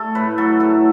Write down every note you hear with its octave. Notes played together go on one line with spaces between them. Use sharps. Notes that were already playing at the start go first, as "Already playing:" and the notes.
Already playing: A3 A4
A2 B4
F#3 A4
A2 A4